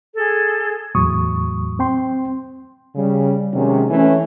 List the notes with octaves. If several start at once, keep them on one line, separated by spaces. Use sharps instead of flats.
G#4 A4
E2 A2 F#3 C#6 D#6
C4 G5 C6
C#3 G3
C3 D#3 F#3 G#3 C#4
E3 A3 C#4